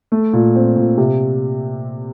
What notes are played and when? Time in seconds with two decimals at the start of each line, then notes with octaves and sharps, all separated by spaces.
0.12 A3
0.33 A#2
0.56 C4
0.77 A#2
0.97 C3